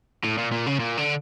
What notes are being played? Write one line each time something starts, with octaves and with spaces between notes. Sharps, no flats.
A2
A#2
A#2
C#3
A#2
D3